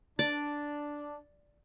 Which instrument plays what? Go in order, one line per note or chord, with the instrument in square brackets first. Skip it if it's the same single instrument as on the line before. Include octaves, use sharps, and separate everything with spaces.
[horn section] D4 [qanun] D5